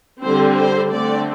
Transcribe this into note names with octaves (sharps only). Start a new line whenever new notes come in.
D3 G3 C4 C5
C5
D3 A3 C4 D5